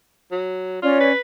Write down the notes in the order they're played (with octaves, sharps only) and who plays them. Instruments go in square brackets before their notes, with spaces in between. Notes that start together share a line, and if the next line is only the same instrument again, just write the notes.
[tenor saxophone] F#3
[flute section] C#4 C#5 D5 [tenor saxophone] F4
[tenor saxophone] B4